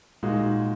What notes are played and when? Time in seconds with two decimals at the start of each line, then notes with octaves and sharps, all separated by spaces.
0.23 A#2 G#3 D#4 F#4